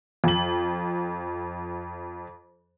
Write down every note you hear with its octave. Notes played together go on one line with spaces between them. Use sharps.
F2 F#7